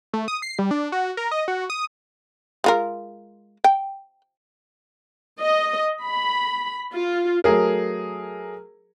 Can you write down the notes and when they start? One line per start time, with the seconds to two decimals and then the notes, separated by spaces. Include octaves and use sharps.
0.13 A3
0.28 D#6
0.42 C7
0.59 G3
0.71 D4
0.92 F#4
1.17 A#4
1.31 D#5
1.48 F#4
1.70 D#6
2.64 G#3 F4 A#4
3.64 G5
5.42 D#5
6.03 B5
6.93 F4
7.44 F#3 A3 G#4 A#4